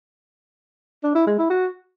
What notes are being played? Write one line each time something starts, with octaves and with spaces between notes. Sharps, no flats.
D4
E4
G#3
E4
F#4